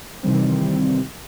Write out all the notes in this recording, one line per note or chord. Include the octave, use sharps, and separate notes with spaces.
C3 D#3 E3 G3 C4